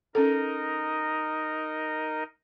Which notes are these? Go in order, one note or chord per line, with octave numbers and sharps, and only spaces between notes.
C#4 D#4 A4 A#4 D#5